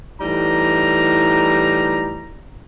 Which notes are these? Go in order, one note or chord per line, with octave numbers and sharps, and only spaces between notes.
A2 E3 G3 D#4 A#5